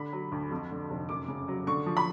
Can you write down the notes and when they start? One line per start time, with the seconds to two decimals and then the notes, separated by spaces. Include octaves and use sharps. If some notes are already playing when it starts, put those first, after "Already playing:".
Already playing: D3 B5
0.13 F#3
0.32 D2
0.51 F2
0.71 D3
0.90 F1
1.09 F#2 D6
1.28 C#3
1.48 F#3
1.67 D3 C#6
1.86 F3
1.97 B5